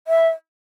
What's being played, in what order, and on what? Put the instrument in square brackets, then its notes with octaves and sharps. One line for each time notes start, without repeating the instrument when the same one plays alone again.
[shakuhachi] E5